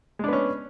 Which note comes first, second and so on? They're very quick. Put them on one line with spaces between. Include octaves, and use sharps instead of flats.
G#3 D4 B3 C#4